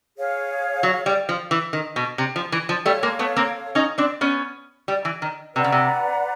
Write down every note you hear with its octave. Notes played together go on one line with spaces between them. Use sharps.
G#4 C#5 F5
F#3
G3
F3
E3
D#3
B2
C3
F3
E3
F3
G3 A3 A4 C#5 F5
G#3 A#3
A3 B3
A#3 C4
C#4 D#4
C4 D4
B3 C#4
G3
E3
D#3
C3 B4 D5 F#5 A#5
C#3
C3